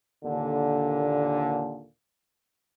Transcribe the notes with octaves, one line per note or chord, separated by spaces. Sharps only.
D#2 A#2 D3